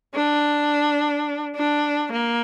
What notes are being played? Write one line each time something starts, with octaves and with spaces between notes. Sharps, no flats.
D4
D4
A#3